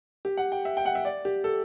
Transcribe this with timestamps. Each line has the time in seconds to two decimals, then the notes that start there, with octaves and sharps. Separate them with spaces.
0.25 G4
0.37 F#5
0.52 G5
0.65 E5
0.77 G5
0.85 F#5
0.95 E5
1.05 D5
1.25 G4
1.44 A4